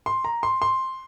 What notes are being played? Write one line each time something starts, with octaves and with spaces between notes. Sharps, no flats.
C6
A#5
C6
C6